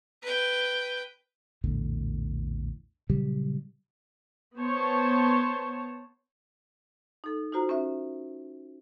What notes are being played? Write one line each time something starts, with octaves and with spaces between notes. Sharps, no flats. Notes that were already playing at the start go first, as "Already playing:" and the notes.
B4 G5
A#1 E2 A2 D3
A#2 C#3 F#3 G3
B3 C5 C#5 A5
D#4 A4
D#4 F4 F#4 C5 A#5
C#4 E5